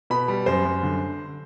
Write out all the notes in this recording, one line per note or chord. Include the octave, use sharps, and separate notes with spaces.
B2 B5
G3
F#2 C5
F#2
D3